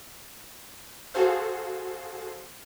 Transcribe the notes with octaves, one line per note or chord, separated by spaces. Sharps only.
F#4 G#4 A4 C5 F5